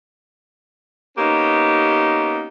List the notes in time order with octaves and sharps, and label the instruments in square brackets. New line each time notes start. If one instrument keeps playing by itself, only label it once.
[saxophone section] A#3 B3 C#4 D#4 G4